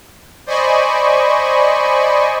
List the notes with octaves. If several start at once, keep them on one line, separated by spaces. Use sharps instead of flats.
C5 D5 D#5 G#5 B5 C#6